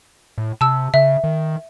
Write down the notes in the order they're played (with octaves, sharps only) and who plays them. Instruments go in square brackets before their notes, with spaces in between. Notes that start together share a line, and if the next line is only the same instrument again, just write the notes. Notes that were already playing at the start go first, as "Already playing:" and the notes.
[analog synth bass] A2
[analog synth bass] C3 [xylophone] A5 E6
[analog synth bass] C#3 [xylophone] E5
[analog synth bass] D#3